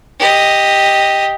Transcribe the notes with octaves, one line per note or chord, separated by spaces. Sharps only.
G4 D#5